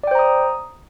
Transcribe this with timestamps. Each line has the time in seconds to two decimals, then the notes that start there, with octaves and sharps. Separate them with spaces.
0.03 D5
0.07 G5
0.11 C5
0.15 A#5
0.19 D#6